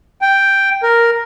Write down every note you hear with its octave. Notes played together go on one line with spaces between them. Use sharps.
G5
A#4